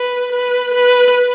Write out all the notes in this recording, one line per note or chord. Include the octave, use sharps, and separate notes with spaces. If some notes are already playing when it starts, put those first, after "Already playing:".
Already playing: B4
B4
B4